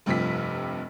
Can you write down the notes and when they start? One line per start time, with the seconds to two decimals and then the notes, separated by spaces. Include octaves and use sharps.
0.06 F1 G2 C3 F3 B6